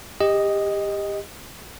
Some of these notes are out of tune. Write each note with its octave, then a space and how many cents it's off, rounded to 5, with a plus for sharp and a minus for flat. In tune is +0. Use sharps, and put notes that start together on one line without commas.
G4 +25 D#5 +0